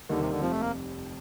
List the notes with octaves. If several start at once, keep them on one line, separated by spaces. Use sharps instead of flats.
D#2 D3 D#3 G3 A#3 D#4
C3
D3
F1 F2 C3 F3
A3
A#3